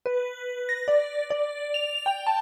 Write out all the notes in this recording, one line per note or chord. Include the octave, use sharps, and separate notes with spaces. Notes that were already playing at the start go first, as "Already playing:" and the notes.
B4
A#6
D5
D5
F7
G5
A5